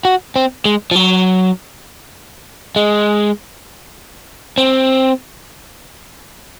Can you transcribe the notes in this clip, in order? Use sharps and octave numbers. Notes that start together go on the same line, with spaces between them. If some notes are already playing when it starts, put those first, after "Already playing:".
F#4
C4
G#3
F3
F#3
G#3
C4